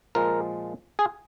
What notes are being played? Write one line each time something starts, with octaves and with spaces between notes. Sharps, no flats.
A#2 F3 G#3 A#4
G#4